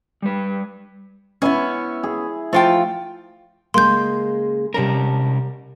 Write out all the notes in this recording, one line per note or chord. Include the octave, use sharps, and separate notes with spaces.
G3 B4
B3 C#4 E4 E5 G#5
G#4
F3 A3 F4 G5
C#3 G#3 A#3 C6 G6
C3 G3 C#4 A#4 A5 A#5